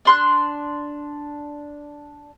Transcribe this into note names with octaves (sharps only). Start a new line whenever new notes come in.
D4 C6 F#6